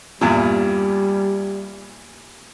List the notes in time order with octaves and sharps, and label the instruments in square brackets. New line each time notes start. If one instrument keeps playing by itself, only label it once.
[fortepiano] E2 G2 A#2 [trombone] G3